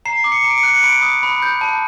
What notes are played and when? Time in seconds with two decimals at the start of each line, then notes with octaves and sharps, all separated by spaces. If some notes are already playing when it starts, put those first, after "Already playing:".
0.05 A#5 C7
0.24 D6
0.32 C#7
0.44 A#5
0.50 D7
0.58 C#7
0.63 F#6
0.74 C#7
0.83 B5 D7
1.02 D#6
1.23 B5
1.42 G6
1.61 A5